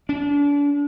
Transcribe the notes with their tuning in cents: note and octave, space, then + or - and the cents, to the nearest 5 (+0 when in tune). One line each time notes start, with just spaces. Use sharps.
D4 -35